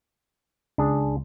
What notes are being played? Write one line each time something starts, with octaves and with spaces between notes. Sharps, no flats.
C#2 D4 G#4